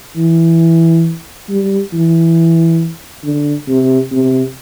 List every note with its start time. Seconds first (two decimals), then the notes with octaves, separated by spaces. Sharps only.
0.16 E3
1.49 G3
1.93 E3
3.24 D3
3.68 C3
4.12 C3